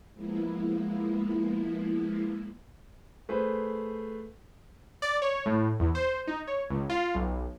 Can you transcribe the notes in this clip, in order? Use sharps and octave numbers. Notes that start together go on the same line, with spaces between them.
F3 G#3 A#3 B3 E4
A3 G#4 B4 C5
D5
C#5
A2
E2
C5
D#4
C#5
C#2
F4
B1